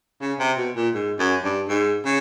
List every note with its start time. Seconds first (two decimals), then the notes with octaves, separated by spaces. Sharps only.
0.21 C#3
0.39 C3
0.58 B2
0.76 A#2
0.94 G#2
1.18 F#2
1.44 G2
1.68 G#2
2.05 C#3